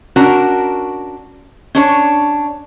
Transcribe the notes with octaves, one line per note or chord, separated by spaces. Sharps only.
C#4 D4 F#4 A#4
C#4 D4 C#5